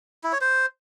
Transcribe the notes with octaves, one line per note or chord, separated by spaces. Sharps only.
E4
C#5
C5